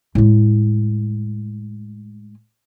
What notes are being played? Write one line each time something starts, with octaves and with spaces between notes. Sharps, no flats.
A2 G#3